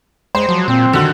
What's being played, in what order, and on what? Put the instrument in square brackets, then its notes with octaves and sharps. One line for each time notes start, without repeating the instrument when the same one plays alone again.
[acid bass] G#3 [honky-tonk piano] C5
[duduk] F3 [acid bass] F#3
[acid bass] A#2 [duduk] C4
[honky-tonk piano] D3 F#4 [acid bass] D#3